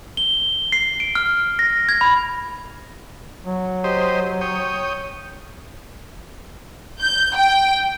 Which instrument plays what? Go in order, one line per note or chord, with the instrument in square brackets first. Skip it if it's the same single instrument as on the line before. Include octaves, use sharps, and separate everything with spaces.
[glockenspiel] G7
C7
D7
F6
A#6
G#6
B5
[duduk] F#3
[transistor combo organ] G4 C5 D#5
C#5 G5 D#6
[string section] G6
G5